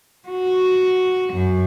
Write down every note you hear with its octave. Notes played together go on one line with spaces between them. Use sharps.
F#4
F#2